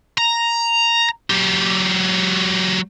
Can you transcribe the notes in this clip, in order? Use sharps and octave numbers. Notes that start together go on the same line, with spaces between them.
A#5
F#3 G4